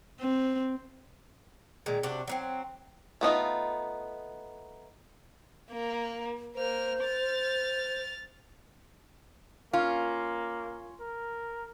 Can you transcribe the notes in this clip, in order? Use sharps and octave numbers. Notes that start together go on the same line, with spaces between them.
C4
A#2 D#3 G#3
C3 D4 F#4
F#3 A#3 C4
A3 B3 D#4 F4
A#3
A#3 C5 F6
F6 A6
A#3 C#4 F4
A#4